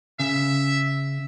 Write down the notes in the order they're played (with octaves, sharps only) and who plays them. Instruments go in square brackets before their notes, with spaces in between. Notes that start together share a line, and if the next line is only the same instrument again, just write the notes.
[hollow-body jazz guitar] C#3 [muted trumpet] E5